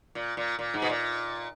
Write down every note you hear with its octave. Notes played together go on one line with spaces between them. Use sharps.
A#2
A#2
A#2
G#2
B2
A#2